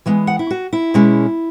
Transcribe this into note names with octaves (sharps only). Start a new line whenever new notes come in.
E3 G#3 B3
F#5
E4
F#4
E4
B2 G#3 C#4